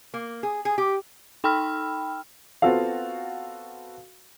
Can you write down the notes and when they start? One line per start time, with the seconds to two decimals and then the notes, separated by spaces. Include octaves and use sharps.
0.14 A#3
0.43 G#4
0.65 G#4
0.78 G4
1.44 D#4 G5 B5 E6 F6
2.62 B3 C4 F4 F#4 A4 F5